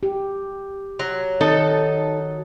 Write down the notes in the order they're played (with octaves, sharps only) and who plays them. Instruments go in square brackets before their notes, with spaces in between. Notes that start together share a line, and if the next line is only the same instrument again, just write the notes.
[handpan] G4
[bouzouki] F#3
[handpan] D#3 [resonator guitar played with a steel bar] D#4 A4